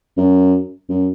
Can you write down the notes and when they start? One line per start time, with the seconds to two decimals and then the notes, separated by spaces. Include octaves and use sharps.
0.17 F#2
0.89 F#2